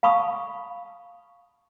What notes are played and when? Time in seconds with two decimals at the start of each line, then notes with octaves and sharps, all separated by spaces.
0.03 F5 A5 B5 C#6 D#6